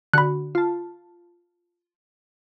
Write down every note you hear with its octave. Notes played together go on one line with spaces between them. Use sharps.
D3 F#4 B5 F#6
F4 A5